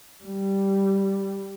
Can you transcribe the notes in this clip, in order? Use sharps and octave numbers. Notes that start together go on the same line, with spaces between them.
G3